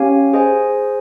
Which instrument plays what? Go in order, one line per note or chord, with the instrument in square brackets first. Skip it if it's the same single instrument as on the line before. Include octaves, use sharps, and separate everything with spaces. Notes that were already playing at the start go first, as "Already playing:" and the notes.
Already playing: [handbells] C#4 G4 C#5 F5 G#5
G#4 C5 D#5 G#5